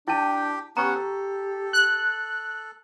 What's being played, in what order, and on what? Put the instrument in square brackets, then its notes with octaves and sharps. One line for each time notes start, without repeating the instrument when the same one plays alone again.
[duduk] D4 [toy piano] E4 A5 [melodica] G4 G5
[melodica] B3 C#4 F#5 [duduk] G4 [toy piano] A#5 C#6
[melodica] A4
[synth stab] F#6